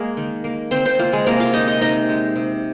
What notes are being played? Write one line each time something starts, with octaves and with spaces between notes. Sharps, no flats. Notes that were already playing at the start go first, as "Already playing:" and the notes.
Already playing: G#3 A#3 G#4
D#3
A#3
D#3 C4 C5
C4 C5
A#3 F4
G#3 G#4
C3 A#3 A#4
F4 F5
G#3 D#4 D#5
D#4 D#5
C3 D#4 D#5
G#3
C3